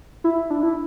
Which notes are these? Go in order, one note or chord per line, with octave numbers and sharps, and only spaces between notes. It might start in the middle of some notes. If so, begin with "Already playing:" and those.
E4
D4
E4